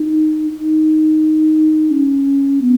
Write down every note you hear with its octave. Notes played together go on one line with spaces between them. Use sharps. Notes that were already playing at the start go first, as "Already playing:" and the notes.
Already playing: D#4
D#4
C#4
B3